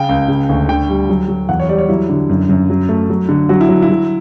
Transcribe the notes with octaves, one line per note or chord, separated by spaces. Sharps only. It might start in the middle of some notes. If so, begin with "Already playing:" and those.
Already playing: C#3 G5
C#2
C#3
D2
D3 G5
G3
F#3
F#3
E2 F#5
C#5
G3 D5
C#5
F#3 E4
D3
F#2
F#2
F#3
A3
F#3
D3
F#3 F#4
E4
F#3
E4
F#3